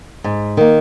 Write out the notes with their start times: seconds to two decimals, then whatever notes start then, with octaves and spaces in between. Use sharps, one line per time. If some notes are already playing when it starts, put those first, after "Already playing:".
0.24 G#2
0.57 D#3 A#3